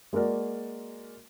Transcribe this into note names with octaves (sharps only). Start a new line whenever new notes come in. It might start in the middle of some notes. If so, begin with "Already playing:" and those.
G#3 A#3 F#4 A#4 D5